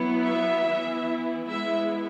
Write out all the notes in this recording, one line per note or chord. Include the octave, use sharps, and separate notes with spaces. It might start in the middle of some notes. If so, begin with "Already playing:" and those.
Already playing: F#3 B3 E4
E5
E3 B3 E4
G#3 B3 E4 E5